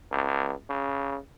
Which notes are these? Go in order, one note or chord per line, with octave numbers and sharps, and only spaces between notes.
C#2
C#3